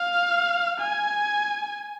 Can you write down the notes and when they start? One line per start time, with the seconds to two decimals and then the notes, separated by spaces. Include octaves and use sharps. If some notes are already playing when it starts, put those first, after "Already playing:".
Already playing: F5
0.80 G#5